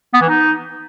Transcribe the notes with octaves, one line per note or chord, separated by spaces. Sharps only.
B3
E3
D#4